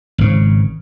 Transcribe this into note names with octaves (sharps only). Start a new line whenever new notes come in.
G#1 C#3